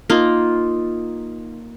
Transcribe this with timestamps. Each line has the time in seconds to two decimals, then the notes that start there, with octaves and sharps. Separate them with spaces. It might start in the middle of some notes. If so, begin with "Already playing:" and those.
0.10 A#3 D#4 F4